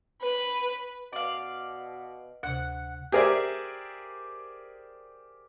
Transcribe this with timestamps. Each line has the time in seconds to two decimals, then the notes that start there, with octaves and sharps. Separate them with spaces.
0.22 B4
1.13 B2 D5 F5
2.43 D2 C3 F#5
3.12 G4 G#4 A#4 C5 D5 E5